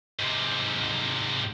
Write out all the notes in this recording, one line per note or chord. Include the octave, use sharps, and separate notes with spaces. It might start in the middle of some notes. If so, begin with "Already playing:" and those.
G#2 C3